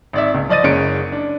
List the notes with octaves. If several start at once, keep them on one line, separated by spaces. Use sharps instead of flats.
G#1 D5 E5
C#2
F3 D5 D#5 A6 D#7
F#1 G#3 C#4 C#7 D7
D4